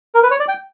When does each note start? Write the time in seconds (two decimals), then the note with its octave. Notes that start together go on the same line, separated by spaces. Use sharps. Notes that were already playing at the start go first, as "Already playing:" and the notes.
0.15 A#4
0.23 B4
0.31 C#5
0.40 D5
0.48 G5